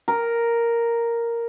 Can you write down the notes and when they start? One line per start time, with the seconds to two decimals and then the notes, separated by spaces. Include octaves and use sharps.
0.08 A#4